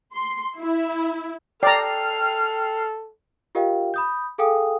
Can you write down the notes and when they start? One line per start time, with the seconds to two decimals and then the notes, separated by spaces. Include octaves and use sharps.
0.14 C6
0.57 E4
1.63 A4 D5 G5 A#5 F6 C7
3.55 F4 G4 A#4 D#5 F5 G5
3.94 B5 D#6 G6
4.38 G#4 A4 F5 G5 G#5 D#6